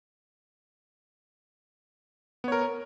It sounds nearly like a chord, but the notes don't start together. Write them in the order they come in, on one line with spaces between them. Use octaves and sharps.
B3 C#5 A#4